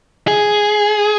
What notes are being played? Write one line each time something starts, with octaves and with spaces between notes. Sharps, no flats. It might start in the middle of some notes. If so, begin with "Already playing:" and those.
G#4